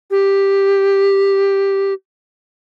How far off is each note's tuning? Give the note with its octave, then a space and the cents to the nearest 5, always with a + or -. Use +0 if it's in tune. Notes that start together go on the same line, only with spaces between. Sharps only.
G4 +5